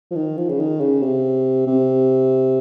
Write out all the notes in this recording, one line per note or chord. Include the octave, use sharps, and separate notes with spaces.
F3
D#3
F3
C#3
D#3
C#3
C3
C3